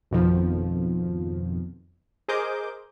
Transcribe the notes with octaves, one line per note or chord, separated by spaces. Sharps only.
G#1 F2 B2 D#3 F3
G#4 A#4 C5 D#5 D6 G6